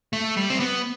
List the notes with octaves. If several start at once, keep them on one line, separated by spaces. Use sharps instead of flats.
A3
G3
C4
B3